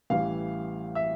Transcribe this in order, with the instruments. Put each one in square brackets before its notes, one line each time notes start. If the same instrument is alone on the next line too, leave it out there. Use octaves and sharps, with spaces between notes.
[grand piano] A1 A2 E3 G3 [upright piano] F5
[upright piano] E5